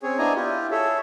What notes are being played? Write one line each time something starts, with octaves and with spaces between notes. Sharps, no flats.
C4 C#4 G#4 C#5
B3 D4 E4 D#5 G#5 A#5
E4 F4 G4
G#4 A4 C#5 E5